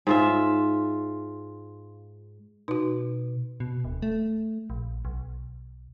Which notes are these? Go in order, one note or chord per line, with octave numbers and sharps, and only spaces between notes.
G#2 F4 E5
B2 D#4 F#4
B2
D1
A3
A#1
B1